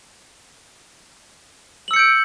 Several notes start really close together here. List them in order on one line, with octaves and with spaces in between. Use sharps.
F#7 E6 C#7 G6 D7